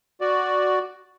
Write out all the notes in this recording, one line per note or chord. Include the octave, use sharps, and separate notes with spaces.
F#4 D5